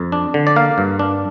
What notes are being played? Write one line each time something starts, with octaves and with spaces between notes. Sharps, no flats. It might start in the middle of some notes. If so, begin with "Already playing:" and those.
Already playing: F2
D4
D3
D5
A#3 F5
G2
D4